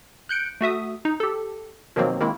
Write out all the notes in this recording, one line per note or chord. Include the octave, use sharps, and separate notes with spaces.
F#6 G6 C#7 D7
A3 F#4 E5 D#6
D#4
G4 A4
B2 D#3 F3 F#3 A#3 C4
D#3 G#3 A#3 C4 E4